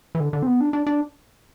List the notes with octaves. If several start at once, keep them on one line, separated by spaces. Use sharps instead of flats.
E3
D3
D3
C4
B3
D4
D4
D4